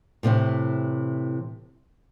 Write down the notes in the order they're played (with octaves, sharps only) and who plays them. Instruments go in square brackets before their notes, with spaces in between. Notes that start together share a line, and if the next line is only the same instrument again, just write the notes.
[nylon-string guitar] A2 C3 D#3 E3